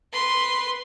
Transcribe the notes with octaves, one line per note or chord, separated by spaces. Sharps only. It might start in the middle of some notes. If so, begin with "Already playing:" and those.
B4 C6